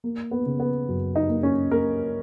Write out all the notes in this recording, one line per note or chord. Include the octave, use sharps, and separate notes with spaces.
A#3
B3
C#3
B3
F#2
D#4
A#3
C#4
A#3 A#4